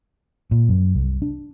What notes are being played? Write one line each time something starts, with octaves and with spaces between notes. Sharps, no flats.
A#2
F#2
C2
D4